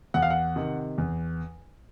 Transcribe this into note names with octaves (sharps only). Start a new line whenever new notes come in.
E2 F#5
F5
F#5
C3 D#3
E2